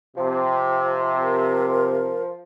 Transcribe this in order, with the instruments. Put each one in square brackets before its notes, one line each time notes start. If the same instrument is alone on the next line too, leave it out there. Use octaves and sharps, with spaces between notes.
[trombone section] C3 [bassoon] F3
[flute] A#4